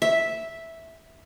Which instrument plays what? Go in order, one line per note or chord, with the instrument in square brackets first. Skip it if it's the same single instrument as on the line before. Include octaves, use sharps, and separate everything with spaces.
[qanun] E5